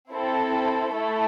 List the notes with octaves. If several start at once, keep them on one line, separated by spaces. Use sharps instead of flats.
C4 E4 A4
A3 E4 A4